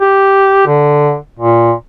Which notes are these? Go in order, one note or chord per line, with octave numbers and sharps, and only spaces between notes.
G4
D3
A#2